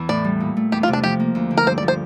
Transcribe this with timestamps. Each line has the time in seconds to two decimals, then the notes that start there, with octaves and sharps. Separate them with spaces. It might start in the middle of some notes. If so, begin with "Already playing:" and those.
Already playing: E2 E3
0.09 A2 D5
0.24 G3
0.40 A#2
0.57 A3
0.72 E2 G4
0.83 F4
0.88 C3
0.93 D4
1.04 F3 G4
1.20 A#3
1.35 D2
1.51 D3
1.57 A#4
1.67 G2 C5
1.78 D5
1.83 F3
1.88 C5